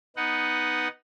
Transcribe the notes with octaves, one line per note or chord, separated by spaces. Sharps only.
B3 D#4 F#5